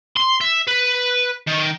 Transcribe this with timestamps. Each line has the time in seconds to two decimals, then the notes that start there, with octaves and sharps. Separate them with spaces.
0.17 C6
0.41 E5
0.67 B4
1.47 D#3